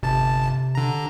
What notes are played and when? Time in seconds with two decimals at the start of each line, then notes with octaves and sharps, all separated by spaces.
0.03 G1 C3 A5
0.75 D3 A#5